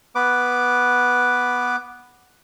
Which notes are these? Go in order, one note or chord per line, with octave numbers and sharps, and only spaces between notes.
B3 B4 D6